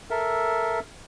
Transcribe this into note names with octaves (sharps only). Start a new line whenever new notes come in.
A4 A#4 E5